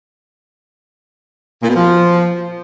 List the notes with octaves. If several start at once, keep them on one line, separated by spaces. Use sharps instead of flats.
A#2
B2
F3